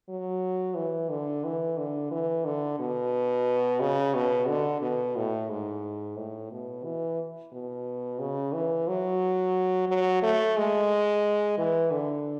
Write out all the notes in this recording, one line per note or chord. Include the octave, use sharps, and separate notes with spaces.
F#3
E3
D3
E3
D3
E3
D3
B2
C#3
B2
D3
B2
A2
G#2
A2
B2
E3
B2
C#3
E3
F#3
F#3
A3
G#3
E3
D3